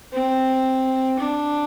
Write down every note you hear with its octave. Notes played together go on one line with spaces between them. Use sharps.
C4
D4